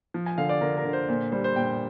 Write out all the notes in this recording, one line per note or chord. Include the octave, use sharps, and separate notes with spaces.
F3
G#5
D3 F5
D5
D3 A#4
A#4
D3
C5
A#2 C5
G3 C5
C5
A#2 G5